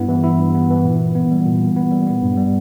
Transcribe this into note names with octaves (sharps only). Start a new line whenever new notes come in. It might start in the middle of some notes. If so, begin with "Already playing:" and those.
Already playing: G2 B3 E4
E3
E4
G2
B3
E3
A#2
A#2
B3
G3
A#2
A#2
B3
G3
B3
G2
G3